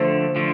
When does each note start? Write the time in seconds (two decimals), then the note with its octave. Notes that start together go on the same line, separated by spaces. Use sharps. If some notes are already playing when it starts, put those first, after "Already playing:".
Already playing: D3 F3 A3 C5
0.36 D3 F3 A3